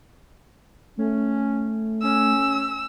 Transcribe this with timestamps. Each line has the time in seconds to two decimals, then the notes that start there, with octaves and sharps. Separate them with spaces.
0.97 A3 C#4
2.03 C#4 E6